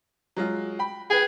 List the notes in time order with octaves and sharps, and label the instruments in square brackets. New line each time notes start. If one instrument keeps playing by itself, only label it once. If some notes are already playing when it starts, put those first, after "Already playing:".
[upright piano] F#3 G#3 F4
G5 B5
[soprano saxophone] G#4 [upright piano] B4 G5